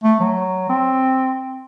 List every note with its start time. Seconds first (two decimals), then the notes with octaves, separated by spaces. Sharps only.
0.03 A3
0.20 F#3
0.69 C4